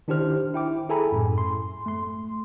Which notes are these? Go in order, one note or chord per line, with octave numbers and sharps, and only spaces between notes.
D#3 D4 E4 G4 C5 F6
E4 G5 D6
E4 G#4 A4 G#5 A#5 B5
F#2 A2
C6
A3 C6